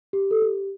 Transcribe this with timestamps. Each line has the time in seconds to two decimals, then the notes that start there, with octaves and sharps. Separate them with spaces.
0.13 G4
0.31 A4
0.42 G4